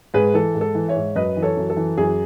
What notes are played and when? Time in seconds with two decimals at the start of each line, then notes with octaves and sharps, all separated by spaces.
0.14 G#2 G#4 B4
0.34 E3 A4
0.55 G#2
0.61 A4
0.75 E3
0.88 C#5 E5
0.95 G#2
1.15 F#2 B4 D#5
1.37 E3
1.42 A4 C#5
1.57 F#2
1.70 A4
1.77 E3
1.98 F#2 G#4